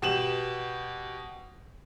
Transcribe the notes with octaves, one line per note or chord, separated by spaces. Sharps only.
B2 G4 E7 F#7